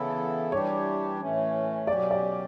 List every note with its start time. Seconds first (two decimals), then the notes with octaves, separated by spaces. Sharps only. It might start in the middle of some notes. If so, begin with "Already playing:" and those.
Already playing: C#3 E3 B3 E4 A4 C#5
0.52 E3 G3 D4 G4 C#5
1.20 A2 E3 A3 C#4
1.87 B2 F#3 C#4 G4 D5
2.11 D5